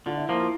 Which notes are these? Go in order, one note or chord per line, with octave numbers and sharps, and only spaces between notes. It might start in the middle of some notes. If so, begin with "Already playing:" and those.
D3 F4
E4
F3 A#3 E4
F4